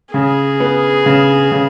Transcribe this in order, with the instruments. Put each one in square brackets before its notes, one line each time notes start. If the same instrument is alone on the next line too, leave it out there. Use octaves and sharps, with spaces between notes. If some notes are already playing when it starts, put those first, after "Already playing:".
[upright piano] C#3 [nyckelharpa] G#4
[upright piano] B3
C#3
C#3